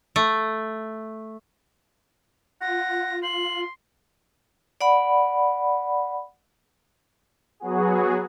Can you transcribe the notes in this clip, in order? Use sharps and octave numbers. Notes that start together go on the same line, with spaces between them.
A3
F4 F#5 A#6
C6 F#7
D5 F#5 B5
F#3 B3 F#4 G#4